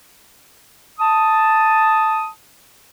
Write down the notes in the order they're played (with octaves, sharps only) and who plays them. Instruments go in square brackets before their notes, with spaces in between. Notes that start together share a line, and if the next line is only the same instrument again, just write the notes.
[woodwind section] A5 D#6